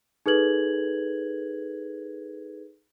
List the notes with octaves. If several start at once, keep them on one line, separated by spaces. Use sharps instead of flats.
D#4 G#4 A4 B4 G#6 F#7